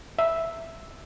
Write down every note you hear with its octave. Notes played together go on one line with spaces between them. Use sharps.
E5